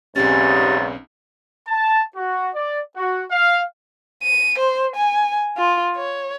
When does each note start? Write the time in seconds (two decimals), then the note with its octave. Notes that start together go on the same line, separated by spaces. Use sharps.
0.16 B1 E2 G#2 C#3 C4 C#4 G4 A6
1.68 A5
2.16 F#4
2.55 D5
2.97 F#4
3.31 F5
4.23 D#7
4.59 C5
4.96 G#5
5.57 F4
5.97 C#5